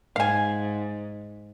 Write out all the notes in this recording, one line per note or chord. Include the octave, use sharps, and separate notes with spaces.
G#2 F5 G#5